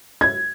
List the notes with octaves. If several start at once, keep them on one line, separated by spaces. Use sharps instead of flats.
G#6